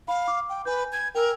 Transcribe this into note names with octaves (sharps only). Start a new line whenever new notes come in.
F5 B5
D6
G5
B4 G#5 G6
G#6
A#4 G5 G#5 E6